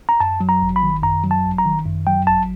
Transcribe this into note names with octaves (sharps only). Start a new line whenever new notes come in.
A#5
F#2 A5
F#3
A#5
G#1
B5
D#3
F#2 A#5
F#3
A5
G#1
A#5
D#3
F#2
F#3 G5
G#1 A5